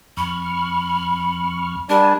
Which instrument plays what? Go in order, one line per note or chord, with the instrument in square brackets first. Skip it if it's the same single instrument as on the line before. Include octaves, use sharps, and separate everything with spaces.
[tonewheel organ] F2 C#6 F6 [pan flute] B5
[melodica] G3 D4 [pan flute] A#4 [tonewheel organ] G#5 A5